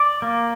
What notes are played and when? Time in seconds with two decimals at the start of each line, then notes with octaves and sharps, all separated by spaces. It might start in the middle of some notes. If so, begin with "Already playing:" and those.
Already playing: D5
0.22 A#3